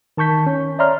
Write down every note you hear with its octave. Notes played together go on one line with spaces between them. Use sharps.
D#3 A5 C#6 G6 B6
C#4
C#5 D5 E5 A#5 C6 F6